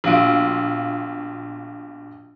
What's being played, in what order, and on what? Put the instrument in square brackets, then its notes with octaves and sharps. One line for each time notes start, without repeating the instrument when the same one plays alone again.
[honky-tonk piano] A#1 B2 F4 D7